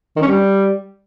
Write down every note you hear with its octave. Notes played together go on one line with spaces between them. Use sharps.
D#3
C#4
G3